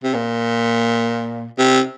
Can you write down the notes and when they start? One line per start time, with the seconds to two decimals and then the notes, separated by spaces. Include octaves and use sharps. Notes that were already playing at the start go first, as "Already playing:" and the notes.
0.03 C3
0.14 A#2
1.58 C3